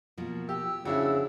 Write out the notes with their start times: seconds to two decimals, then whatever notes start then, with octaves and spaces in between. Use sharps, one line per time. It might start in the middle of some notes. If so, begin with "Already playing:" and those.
0.18 B2 F3 A#3
0.49 G4 E6
0.85 F2 C#3 D4 E4 F#4